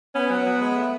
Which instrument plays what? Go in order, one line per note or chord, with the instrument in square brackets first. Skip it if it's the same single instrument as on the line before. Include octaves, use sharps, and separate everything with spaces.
[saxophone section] B3 [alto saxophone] C#4
[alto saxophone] F#3
F#3
G#3
A3